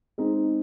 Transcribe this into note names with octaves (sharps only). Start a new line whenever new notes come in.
G#3 C4 D#4 G#4